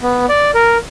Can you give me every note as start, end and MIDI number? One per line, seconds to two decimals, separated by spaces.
0.01 0.26 59
0.29 0.51 74
0.55 0.77 70